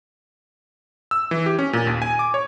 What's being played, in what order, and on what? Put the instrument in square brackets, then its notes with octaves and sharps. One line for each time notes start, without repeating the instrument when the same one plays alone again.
[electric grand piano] E6
E3
G4
C#4
A#2
D#2
G#5
D6
C#5